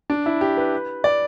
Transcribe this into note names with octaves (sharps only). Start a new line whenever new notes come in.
D4
E4
G4
B4
D5